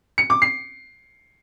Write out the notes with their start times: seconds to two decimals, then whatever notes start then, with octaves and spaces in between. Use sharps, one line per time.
0.18 C#7
0.30 D6
0.42 C7